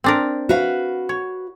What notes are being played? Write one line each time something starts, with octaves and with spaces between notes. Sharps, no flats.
C4 D4 A#4
F#4 B4 F5
C#5